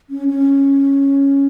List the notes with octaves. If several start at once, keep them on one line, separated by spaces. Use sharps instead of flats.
C#4
C#4